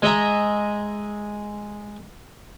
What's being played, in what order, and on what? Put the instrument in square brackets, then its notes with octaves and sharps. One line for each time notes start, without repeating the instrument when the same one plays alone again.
[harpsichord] G#3 D#5 E5 A#5